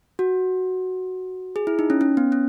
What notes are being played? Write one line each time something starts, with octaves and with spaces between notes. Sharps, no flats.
F#4
G#4
E4
D#4
C#4
C#4
B3
C#4